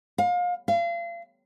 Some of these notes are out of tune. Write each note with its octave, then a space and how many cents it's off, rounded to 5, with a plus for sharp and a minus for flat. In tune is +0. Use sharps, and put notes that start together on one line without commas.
F5 +30
F5 -35